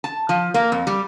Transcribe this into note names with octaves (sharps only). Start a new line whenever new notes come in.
A5
F3
A#3
F2
G3